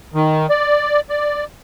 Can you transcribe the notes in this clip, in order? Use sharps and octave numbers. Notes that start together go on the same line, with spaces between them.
D#3
D5
D5